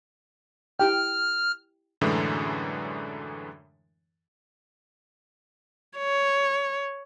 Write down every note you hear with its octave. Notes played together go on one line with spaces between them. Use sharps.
E4 G4 G5 F6
F#2 A2 D3 E3 G#3
C#5